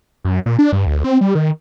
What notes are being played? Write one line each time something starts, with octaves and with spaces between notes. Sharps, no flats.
F#2
A#2
D4
G2
D2
C4
G3
D#3